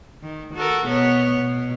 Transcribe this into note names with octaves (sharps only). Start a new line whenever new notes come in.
D#3
F#4 A4 A#4
B2 B3 C#5
B2